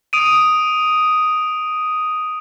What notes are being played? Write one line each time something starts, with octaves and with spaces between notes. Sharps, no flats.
D#6 D7 D#7